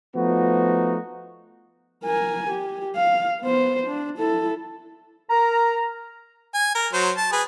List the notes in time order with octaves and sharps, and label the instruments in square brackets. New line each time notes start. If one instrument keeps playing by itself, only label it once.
[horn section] F3 A3 B3 D#4 F#4
[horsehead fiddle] A#4 G#5
G4
F5
B3 C5
D4
E4 A4
[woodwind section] A#4 A#5
[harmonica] G#5
A#4
F#3 C5
A5
G#4 B4